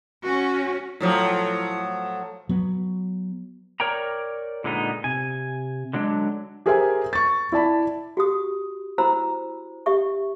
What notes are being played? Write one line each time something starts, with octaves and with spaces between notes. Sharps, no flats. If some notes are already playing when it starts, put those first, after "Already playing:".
C#4 F#4
A2 F3 F#3
F#3 B3
A#4 C#5 D5 G5 A#5
A#2 D3 G#3 B3 D#4
C3 G#5
D3 F#3 G#3 D4
G4 G#4 A#4 C5 E5 G#5
C#6 A6
E4 D5 A5 B5
F#4 G4 D#6
E4 F#4 C5 A#5 B5 E6
G4 E5 C#6